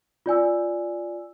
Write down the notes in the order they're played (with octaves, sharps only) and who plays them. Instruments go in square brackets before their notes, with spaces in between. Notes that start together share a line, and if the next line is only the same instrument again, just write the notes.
[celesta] F4 D5 G#5 E6